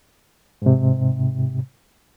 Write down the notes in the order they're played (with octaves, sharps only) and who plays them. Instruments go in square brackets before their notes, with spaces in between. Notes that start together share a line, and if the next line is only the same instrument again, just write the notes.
[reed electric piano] G#2 C3